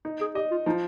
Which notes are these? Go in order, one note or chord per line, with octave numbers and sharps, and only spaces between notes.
D#4
G#4
G4 D#5
F4
F3 D#4